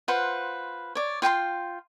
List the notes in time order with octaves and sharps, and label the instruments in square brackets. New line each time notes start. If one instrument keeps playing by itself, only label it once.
[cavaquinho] F4 B4 C5 F#5
C#5 D5
F4 G5 G#5 C6